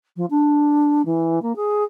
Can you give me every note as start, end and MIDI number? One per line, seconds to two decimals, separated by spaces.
0.17 0.26 53
0.31 1.02 62
1.06 1.40 52
1.42 1.55 58
1.56 1.84 68